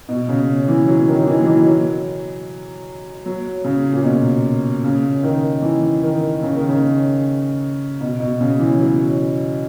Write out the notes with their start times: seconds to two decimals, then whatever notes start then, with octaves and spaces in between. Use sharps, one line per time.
0.09 B2
0.29 C#3
0.68 E3
0.88 F#3
1.08 D#3
1.27 E3
1.40 F#3
1.47 E3
1.66 F#3
3.26 F#3
3.64 C#3
3.93 A#2
4.04 B2
4.84 C#3
5.23 D#3
5.62 E3
6.03 D#3
6.43 C#3
6.55 D#3
6.69 C#3
8.01 B2
8.20 B2
8.41 C#3
8.59 E3
8.80 F#3